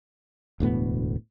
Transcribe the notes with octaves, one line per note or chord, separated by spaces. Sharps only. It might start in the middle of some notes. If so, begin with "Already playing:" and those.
E1 D2 A2 B3